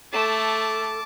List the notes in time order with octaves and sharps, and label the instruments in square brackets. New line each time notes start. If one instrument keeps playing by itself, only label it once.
[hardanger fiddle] A3 [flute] A4 [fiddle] A5 D6